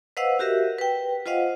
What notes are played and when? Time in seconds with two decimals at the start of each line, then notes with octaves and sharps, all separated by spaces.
0.17 B4 C5 D#5 F5 F#5 E6
0.39 F#4 G4 A#4 E5
0.79 B4 G5
1.26 F4 C5 D#5 F5 F#5